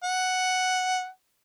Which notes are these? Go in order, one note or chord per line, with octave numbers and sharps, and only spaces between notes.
F#5